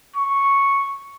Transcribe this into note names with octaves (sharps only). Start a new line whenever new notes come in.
C#6